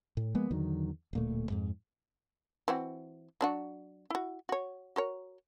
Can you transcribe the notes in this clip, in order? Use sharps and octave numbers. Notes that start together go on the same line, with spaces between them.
A2
F3 G#3 A#3 B3
E2 D3 D#3 F#3
D1 A#2 A3
F2 G#2
E3 C4 F#4
F#3 D4 F#4
E4 F#4
F#4 C#5
F#4 A#4 C#5